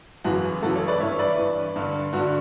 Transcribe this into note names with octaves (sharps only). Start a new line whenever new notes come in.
F#2 C#3 E3 F#4
F#2 C#3 E3 F#4 A4
A4 C#5
B4 D5
G2 E3 C#5 E5
E5
B4 D5
G2 E3
G2 D3
G2 D3 F#4